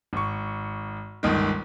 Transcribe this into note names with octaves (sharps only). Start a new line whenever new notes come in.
G#1 C#6
G1 C#2 D#3